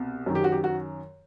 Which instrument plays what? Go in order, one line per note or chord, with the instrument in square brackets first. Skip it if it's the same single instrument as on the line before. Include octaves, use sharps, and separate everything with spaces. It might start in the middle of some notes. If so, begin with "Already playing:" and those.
Already playing: [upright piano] C2 B2
F#2 D#3
G4
F#4
G4
F#4